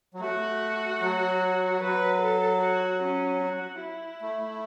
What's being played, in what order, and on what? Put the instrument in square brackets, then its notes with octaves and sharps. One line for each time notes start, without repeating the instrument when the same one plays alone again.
[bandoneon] F#3
[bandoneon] A3 [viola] F#4
[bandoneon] F#3
[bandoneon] F#3 [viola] B4
[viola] A4
F#4
C#4
F#4
E4
[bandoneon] A3